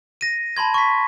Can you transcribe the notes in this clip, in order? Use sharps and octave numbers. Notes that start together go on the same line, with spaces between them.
A#6 D#7
A5 B5 C6 G#6
C#6 B6